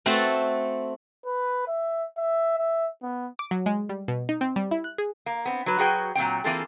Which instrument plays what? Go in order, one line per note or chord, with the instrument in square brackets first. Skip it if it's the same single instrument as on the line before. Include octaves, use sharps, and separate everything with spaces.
[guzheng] A3 C4 F#4 A4 C5 A5
[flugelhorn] B4
E5
E5
E5
B3
[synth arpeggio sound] D6
F#3
G#3
G3
B2
D#4
C4
G3
E4
F#6
G#4
[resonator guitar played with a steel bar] A#3
B3 C4
F#3 B4
F#3 F#4 G#4 B4 G5
A#2 F#3 C4 G5
E3 A#3 C4 F4 G#4 A4